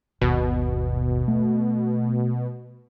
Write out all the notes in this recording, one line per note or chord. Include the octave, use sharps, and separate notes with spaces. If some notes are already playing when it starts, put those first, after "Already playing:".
G1 D#2 B2
A3